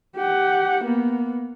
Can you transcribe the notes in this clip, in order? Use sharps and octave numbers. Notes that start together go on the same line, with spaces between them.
G4 F#5
A#3 B3